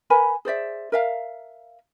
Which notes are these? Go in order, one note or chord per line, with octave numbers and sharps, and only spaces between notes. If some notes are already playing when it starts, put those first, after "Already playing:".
A#4 B4 G#5 B5
G#4 C5 D5 E5
A#4 E5 F5